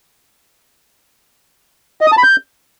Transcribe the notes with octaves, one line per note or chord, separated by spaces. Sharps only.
D#5
D#6
A5
B5
G6